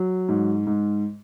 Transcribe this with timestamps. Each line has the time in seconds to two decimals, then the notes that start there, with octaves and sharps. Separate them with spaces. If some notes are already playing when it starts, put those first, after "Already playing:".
Already playing: F#3
0.29 G#2
0.67 G#2